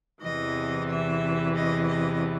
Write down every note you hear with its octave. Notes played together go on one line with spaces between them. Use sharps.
E2 C3 E3 D#5
E5
D#5
D#5